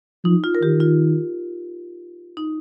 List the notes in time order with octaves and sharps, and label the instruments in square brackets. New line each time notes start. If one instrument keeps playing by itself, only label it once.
[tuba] F3 [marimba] D#4
[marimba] F4
A#4
[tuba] D#3 [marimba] G4
[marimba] F4
D#4